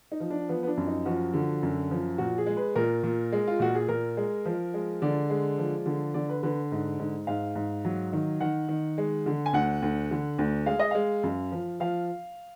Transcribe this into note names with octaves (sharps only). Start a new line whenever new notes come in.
D#4
F3
D4
F3 B3
B3
D4
F#2
D#4
F3 F#4
D3
F#2
F3
A#2 F#4
G#4
G#3
B4
A#2 A#4
A#2
G#3
F4
A#2 F#4
G#4
A#2 A#4
G#3
F3
G#3
D3 D5
G#3
F3
D3
D3 D5
B4
D3 B4
G#2
G#2
G#2 F5
G#2
F#3
D#3
D#3 F#5
D#3
G#3
D3
G#5
D2 F#5
D2
D3
D2
G#3 F5
D#5
G#3 F5
F#2
F3
F3 F5